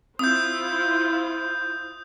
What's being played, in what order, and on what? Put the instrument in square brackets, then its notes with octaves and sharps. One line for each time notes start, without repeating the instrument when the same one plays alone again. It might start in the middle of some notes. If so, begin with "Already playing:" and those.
[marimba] C4 [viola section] E4 F4 C5 [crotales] D#6 G6